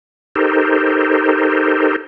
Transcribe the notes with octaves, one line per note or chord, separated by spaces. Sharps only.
D#4 G4 A4 A#4 C5